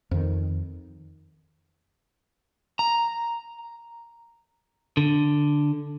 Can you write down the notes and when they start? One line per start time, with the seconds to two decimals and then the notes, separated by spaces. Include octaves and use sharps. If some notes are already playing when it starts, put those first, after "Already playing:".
0.11 F2 D#3
2.79 A#5
4.97 D3